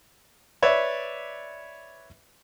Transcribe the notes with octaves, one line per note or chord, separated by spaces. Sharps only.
B4 C#5 D5 E5